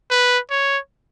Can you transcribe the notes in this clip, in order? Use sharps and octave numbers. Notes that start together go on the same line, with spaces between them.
B4
C#5